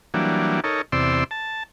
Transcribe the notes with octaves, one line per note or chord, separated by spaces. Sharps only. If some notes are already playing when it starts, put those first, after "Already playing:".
E3 F#3 G3 A#3 D4
D#4 A4 A#4 C#5
E2 C3 D5 C6 E6
A5